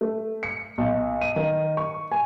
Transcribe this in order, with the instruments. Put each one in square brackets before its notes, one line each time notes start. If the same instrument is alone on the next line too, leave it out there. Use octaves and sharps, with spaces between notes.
[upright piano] A3
C#7
B1
D#7
D#3
C#6
G#5